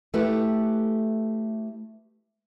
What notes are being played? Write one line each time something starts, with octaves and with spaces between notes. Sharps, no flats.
A3 E4 G4 A4 B4